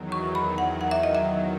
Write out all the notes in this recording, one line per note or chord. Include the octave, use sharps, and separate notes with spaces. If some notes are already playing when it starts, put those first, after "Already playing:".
Already playing: E2 D#3 F#3
C#6
B5
F#5
F#5
E5
D#5
E5